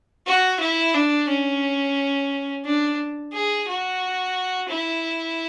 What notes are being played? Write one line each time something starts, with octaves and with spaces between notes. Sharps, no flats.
F#4
E4
D4
C#4
D4
G#4
F#4
E4